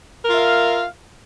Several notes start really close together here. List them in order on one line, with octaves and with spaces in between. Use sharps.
A#4 F4 E5 F5